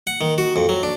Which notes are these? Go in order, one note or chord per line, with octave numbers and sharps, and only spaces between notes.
F#5
D#3
F#4
F2
F#3
D4